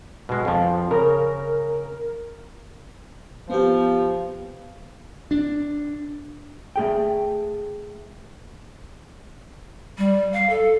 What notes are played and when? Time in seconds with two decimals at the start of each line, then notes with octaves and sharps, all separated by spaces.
0.29 B2 G#3
0.45 F2 F3
0.91 C#3 A#4
3.50 F3 B3 G4
5.31 D4
6.76 A3 G#4 G5
9.98 G3
10.33 F5
10.49 A4